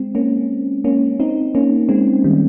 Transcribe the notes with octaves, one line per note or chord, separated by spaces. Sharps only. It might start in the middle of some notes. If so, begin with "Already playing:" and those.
Already playing: G#3 C4
A#3 C#4
A#3 C#4
C4 D#4
A#3 C#4
G#3 C4
D#3 G3